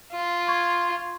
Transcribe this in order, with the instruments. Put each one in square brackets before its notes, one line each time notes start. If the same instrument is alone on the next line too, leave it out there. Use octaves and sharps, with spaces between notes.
[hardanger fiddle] F4
[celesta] C6 C#6 G#6